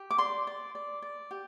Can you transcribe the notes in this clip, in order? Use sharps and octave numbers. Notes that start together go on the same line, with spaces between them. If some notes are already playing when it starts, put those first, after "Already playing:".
Already playing: G4
D6
D5 C6
D5
D5
D5
G4